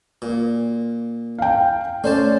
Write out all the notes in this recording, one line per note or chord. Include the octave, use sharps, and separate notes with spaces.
A#2
F5 G5
A3 C#4 C5 D5 A5